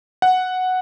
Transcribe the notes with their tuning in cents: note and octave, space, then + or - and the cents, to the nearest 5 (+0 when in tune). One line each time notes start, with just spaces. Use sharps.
F#5 +0